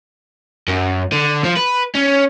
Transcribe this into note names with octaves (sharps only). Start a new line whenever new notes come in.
F#2
D3
F3
B4
C#4